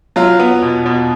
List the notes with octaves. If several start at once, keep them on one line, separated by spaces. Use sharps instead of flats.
F#3 F4
B3
B2
B2